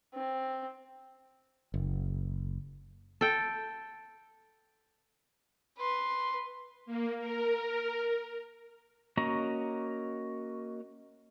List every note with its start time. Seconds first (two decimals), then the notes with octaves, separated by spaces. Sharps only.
0.14 C4
1.74 F#1
3.21 A4 G5
5.78 B4 C6
6.86 A#3
7.16 A#4
9.17 A#3 C#4 F#4 D#5 A#5